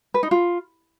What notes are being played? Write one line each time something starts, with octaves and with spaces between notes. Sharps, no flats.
B4
D#4
F4